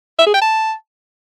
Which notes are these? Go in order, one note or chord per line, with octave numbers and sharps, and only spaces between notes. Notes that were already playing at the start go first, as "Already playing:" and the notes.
E5
G#4
G5
A5